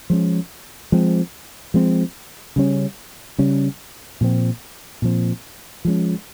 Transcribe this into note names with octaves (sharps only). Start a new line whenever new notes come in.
F3 G#3 C#4
F3 G#3 C4
F3 G#3 C4
C#3 G3 C#4
C#3 G3 C#4
A#2 F3 C4
A#2 F3 C4
F3 G#3 C#4